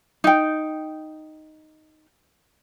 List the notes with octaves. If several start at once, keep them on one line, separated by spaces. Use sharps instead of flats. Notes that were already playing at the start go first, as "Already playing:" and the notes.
D#4 G5